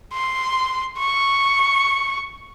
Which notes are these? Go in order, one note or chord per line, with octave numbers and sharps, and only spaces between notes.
C6
C#6